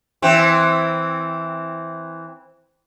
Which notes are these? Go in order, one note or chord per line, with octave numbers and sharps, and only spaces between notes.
E3 C4